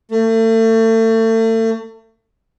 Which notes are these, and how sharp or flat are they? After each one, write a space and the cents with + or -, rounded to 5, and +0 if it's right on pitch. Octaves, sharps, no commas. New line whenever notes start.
A3 +35